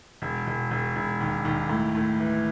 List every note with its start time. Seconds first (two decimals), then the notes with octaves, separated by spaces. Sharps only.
0.22 E1
0.47 E1
0.71 E1
0.96 E1
1.20 D#2
1.45 D#2
1.69 A2
1.95 A2
2.20 E3